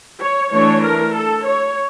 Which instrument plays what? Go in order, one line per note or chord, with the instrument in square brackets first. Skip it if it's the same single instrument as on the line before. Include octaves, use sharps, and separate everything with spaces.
[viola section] C#5
E3 A3 D4 C#5
A#4
A4
C#5